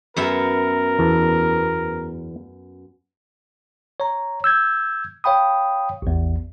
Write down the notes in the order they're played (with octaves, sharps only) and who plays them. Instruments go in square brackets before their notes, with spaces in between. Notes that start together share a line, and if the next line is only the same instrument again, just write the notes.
[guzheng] F#2 B3 E5 [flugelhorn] A#4
[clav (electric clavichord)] E2 A5
[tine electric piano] C#5 A#5
E6 G6 G#6
C#5 F5 G5 B5 D#6
A1 E2